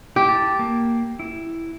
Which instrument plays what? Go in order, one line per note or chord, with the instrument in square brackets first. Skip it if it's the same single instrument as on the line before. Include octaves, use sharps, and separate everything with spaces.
[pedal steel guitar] E4 [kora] G4
[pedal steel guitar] A5
A#3
E4